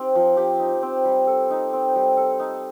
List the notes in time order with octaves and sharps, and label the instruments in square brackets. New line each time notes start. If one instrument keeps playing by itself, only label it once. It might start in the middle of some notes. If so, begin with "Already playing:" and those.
Already playing: [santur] C4 D#4 G4
F3
G4
D#4
C4
G3
A4
D#4
C4
G3
A4
D#4